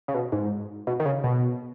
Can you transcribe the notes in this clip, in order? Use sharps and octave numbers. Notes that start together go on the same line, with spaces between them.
C#3
B2
G#2
B2
D#3
C#3
B2